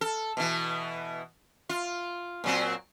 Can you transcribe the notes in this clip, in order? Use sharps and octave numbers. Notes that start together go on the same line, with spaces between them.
A4
B2 E3
F4
A#2 F#3 C4